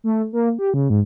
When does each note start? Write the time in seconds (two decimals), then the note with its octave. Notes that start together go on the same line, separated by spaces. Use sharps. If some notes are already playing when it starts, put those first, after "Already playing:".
0.04 A3
0.33 A#3
0.59 G4
0.74 C#3
0.90 G#2